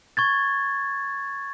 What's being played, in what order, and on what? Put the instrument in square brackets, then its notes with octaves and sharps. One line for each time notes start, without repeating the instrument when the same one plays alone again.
[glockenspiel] C#6 G#6 A6